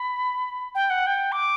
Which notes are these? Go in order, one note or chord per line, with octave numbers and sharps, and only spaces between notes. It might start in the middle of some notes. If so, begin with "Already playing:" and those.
Already playing: B5
G5
F#5
G5
D6